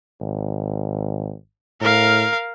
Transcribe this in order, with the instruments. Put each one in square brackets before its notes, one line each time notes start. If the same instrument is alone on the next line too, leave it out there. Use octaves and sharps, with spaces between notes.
[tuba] G#1
[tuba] A2 [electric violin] A#4 F5